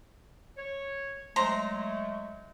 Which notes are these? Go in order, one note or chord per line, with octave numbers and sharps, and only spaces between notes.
C#5
F#3 G#3 A3 C5 A#5